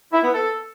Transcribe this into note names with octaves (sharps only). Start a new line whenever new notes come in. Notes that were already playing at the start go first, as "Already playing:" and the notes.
E4
B3
A4